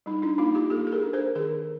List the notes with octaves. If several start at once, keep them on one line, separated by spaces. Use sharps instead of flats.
G3 D#4
D4 E4
A#3 D#4 F4
F4 G4
A#3 G4 A4
A4
G#4 A#4
D4
A#4 C5
D#3 G#4 A#4